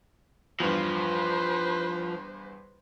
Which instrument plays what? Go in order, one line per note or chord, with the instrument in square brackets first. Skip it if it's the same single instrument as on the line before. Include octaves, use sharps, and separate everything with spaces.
[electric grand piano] E2 G2 [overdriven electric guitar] F3 [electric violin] B4 C5